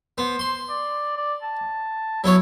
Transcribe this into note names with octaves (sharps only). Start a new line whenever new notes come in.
B3 C5
C6
D5
D5
A5
F#3 B3 E4 C#5